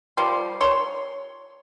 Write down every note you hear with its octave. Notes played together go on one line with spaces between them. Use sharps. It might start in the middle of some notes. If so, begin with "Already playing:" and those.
F3 G3 C6
C#5 C6